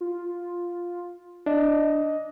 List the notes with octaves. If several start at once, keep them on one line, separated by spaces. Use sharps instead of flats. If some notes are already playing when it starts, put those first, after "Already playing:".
F4
D4 D#5